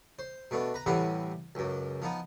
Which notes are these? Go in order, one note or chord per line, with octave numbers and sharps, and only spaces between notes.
C5
B2 A3 B3 D4
B4 A#5
A2 C3 E3 G3 F#5 B5
C#2 F#2
F3 B3 D#4